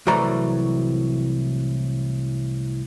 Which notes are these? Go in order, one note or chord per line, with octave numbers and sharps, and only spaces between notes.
C2 A2 E3 F#3 D5 A#5